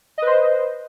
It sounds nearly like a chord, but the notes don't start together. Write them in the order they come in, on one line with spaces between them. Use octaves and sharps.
D#5 B4 C5